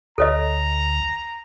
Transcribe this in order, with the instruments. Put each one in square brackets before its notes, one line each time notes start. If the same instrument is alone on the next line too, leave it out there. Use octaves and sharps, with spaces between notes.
[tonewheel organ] D2 [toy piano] A4 C#5 D#5 [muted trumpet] A#5